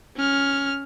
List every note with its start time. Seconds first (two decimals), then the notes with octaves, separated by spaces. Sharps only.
0.16 C#4 F6